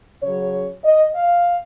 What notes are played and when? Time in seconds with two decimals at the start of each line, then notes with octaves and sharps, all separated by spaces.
0.23 C#3 F#3 C#5
0.84 D#5
1.14 F5